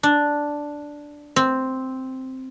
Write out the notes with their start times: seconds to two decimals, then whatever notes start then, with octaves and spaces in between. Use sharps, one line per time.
0.03 D4
1.36 C4